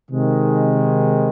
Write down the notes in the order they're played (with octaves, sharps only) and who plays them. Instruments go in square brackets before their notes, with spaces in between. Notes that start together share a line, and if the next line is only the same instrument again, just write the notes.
[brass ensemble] C3 D#3 G#3